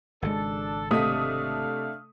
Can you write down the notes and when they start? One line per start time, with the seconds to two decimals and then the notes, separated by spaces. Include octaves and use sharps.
0.22 G#1 C#3 G#3 D4 A4
0.91 C3 A3 D4 D#5 F5 D#6 B6